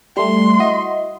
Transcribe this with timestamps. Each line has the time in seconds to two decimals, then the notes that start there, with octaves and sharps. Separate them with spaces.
0.17 G3 A3 C6
0.59 E4 F#4 D#5